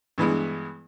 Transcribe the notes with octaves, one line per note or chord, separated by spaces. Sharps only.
G2 E3 G#3 B3